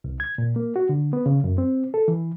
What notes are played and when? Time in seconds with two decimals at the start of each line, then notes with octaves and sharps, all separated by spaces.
0.04 C2
0.20 G#6
0.38 A#2
0.56 A#3
0.76 F#4
0.89 D3
1.13 B3
1.26 C#3
1.44 F#2
1.58 C4
1.94 A4
2.08 E3